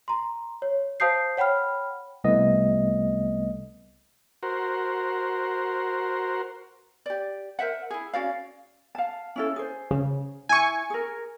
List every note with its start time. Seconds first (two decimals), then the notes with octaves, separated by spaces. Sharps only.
0.08 A#5 C6
0.62 C#5
1.00 C5 F5 A5 D#6 G6 C7
1.37 C#5 F#5 G5 B5 F6
2.24 C2 A3 B3 D#5
4.43 F#4 A#4 C5
7.06 G4 D5
7.59 A#4 C5 E5 F#5
7.90 E4 G#4
8.14 C#4 F#4 D5 F5
8.95 F5 A5
9.36 C#4 E4 A4
9.56 G#4 C5
9.91 C#3
10.49 E4 G#5 C#6
10.90 G#4 A#4